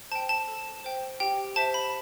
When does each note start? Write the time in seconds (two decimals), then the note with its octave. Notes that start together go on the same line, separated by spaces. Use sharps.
0.11 C5 G5 A5
0.29 A5
0.48 A4
0.84 C5 G5
1.20 G4 G5
1.56 C5 E5 A5
1.74 B5